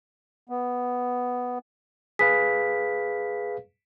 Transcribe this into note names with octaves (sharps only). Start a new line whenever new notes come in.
B3
G#4 B4 F5 B6